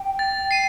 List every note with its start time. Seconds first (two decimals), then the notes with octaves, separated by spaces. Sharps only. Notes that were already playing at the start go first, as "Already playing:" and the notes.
Already playing: G5
0.19 A6
0.51 C7 D#7